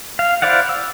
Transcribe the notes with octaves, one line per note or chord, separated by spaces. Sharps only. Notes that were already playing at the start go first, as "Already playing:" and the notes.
F5
E4 C5 D5 F5 F#5
E6